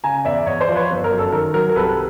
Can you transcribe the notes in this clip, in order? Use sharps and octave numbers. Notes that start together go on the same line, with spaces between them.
C#3 G#5 A#5
E2 D5 E5
E2 C#5 D#5
C5 D5
F3
B4 C#5
G1
A#4
F#2
A4
D#3 A#4
F#3 A#4
A#4
C2 A4 B4
B4